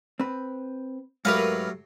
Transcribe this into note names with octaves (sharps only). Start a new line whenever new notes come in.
C4 B4
G#2 F#3 A3 G4 A#4 B4 F5